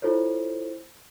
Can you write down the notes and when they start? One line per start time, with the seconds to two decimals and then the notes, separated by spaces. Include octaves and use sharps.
0.02 E4 F4 A4 C5 C#5